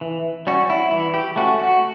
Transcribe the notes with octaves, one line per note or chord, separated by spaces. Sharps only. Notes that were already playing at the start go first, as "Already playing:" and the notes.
E3
G3 C#4 F#4
E4
E3 E4
G4
A3 C#4 F#4
F#4